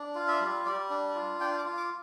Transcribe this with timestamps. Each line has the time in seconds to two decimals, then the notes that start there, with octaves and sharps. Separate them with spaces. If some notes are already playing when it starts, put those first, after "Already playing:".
Already playing: D4
0.15 F4 F5
0.28 E5
0.41 G3
0.65 G3 D5
0.90 D4
1.15 F4
1.41 D4 G5
1.58 D6
1.65 F4
1.77 D6